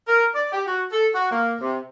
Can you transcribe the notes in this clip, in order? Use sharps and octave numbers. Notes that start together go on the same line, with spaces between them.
A#4
D5
G4
F#4
A4
F#4
A#3
C3